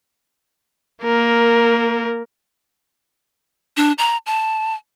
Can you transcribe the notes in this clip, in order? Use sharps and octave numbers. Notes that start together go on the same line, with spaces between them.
A#3 A#4
D4
A#5
A5